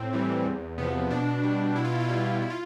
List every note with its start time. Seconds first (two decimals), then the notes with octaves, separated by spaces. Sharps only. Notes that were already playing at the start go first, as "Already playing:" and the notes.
Already playing: A2 C4
0.13 E3 G3
0.45 E2
0.78 C3 F3 B3
1.10 B2 D4
1.43 G3
1.76 B2 E4
1.84 F4
1.92 E4
2.00 F4
2.09 G3 E4
2.17 F4
2.25 E4
2.34 F4
2.42 E4
2.50 F4